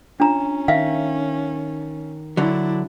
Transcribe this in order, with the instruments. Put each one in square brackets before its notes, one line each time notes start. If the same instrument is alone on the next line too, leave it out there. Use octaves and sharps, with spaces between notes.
[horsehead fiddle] C#4 [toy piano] D4 F4 A#5
[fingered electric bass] D#3 [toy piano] E5 F5
[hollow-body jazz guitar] D3 F#3 [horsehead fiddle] D4 E4